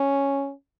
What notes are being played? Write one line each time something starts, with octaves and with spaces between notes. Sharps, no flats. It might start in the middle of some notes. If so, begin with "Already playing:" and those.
Already playing: C#4